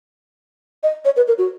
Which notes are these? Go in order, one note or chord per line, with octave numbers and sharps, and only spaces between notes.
D#5
C#5
B4
A#4
F#4